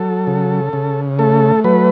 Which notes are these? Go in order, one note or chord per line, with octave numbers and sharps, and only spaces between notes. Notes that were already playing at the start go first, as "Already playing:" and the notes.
Already playing: F#3 A4
C#3
C#3
A3 A4
F#3 B4